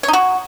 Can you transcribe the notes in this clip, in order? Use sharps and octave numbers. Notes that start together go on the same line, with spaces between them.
C#5
D#4
F#4